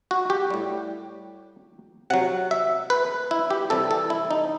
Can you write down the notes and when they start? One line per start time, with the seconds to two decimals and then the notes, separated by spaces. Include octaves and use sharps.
0.11 F#4
0.30 G4
0.50 A2 G3
2.10 C3 F#3 F#5
2.51 E5
2.90 B4
3.31 E4
3.50 G4
3.70 C3 E3 G3 A4
3.91 A4
4.10 E4
4.31 D#4